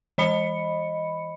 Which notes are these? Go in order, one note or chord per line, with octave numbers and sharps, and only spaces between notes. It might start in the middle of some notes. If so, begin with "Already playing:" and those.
E3 D#5 B5 C#7